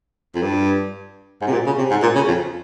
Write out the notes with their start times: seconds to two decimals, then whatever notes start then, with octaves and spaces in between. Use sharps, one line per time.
0.35 F2
0.42 G2
1.41 G#2
1.47 C3
1.53 A#2
1.66 C#3
1.78 C3
1.91 G#2
2.02 A#2
2.15 C#3
2.28 F2